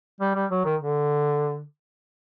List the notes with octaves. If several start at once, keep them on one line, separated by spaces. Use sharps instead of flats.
G3
G3
F#3
D#3
D3